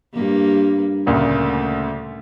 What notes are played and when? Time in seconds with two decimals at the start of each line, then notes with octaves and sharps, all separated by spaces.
0.13 G2 A#3
1.06 D2 A#2 C#3 A3